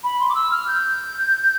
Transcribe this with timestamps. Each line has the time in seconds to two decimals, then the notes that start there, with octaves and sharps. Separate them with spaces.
0.04 B5
0.20 C6
0.30 D6
0.35 E6
0.51 F6
0.68 G6